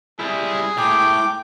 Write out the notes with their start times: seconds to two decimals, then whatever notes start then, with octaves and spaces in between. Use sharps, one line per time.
0.19 G3 E4 G#4
0.78 A2 G5 D6